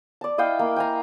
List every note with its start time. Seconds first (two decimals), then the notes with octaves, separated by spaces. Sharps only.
0.21 D5 A5
0.38 E4 D#5 F5 G5
0.59 A#3
0.76 G5 G#5 A#5